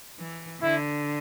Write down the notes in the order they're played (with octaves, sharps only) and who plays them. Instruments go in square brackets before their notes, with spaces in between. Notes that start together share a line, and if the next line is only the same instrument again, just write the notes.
[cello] E3
[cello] D3 [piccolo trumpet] E4